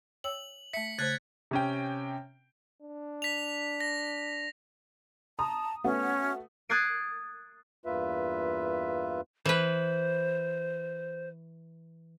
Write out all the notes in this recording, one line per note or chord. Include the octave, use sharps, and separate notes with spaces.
C#5 G5 E6 F#7
A3 E5 B6 C#7
C#3 A3 C5 F#6 G#6 A6
C3 C#4 G5
D4
B6 F7
A#6
A5 A#5 D#6
A3 B3 C#4 F#4
D#6 F#6 G#6 A6 C7 D7
E2 G2 A#3 F4 B4 E5
E3 B4 C5